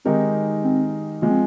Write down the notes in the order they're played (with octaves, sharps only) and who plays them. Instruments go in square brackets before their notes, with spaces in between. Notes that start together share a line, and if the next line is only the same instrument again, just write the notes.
[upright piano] D#3 G#3 D#4 G4 A#4 [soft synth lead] C4
[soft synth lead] C4
[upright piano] F3 G#3 [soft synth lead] A#3
[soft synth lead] C4